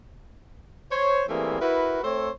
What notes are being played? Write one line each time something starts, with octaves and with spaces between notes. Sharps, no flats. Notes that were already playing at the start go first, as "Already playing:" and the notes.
C5 C#5
E3 G3 A3 A#3 C4 G#4
E4 F#4 A#4 B4
A3 C4 A4 C5 C#5